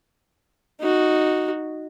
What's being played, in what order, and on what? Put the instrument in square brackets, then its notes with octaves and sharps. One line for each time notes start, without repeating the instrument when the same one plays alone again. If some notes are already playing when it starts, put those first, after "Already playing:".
[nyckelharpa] D#4 F#4